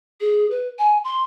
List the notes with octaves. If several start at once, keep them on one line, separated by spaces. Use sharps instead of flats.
G#4
B4
G#5
C6